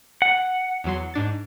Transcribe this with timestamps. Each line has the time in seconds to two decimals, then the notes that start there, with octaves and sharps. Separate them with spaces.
0.22 F#5
0.84 E2 F#3 C6
1.14 G#2 D4 A6